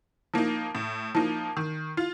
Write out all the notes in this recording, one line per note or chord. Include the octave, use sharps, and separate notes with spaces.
F3 A#3 D#4
A2
F3 A#3 D#4
D#3
F4